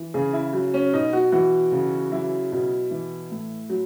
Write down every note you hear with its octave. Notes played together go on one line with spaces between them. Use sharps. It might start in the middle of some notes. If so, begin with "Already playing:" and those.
Already playing: E3
C#3 G#4
E4
F#3
C#4
B2 D#4
F#4
E3 F#4
C#3
F#3 E4
B2
E3
A2
F#3